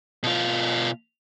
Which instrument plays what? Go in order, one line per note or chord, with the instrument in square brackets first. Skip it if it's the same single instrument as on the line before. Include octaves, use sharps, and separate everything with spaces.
[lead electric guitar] B2 F4